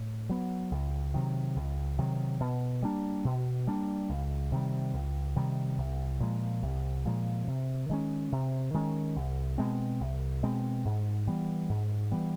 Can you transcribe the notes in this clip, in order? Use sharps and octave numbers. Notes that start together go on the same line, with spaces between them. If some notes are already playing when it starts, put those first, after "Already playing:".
Already playing: A2
F#3 B3
C#2
C3 D#3 F#3
C#2
C3 D#3 F#3
B2
G3 A#3 D4
B2
G3 A#3 D4
C#2
C3 D#3 G3
C#2
C3 D#3 G3
C2
A#2 F3 G#3
C2
A#2 F3 G#3
C3
D#3 G#3 C#4
C3
D#3 G#3 C#4
C2
B2 G#3 C4
C2
B2 G#3 C4
G#2
E3 G3 B3
G#2
E3 G3 B3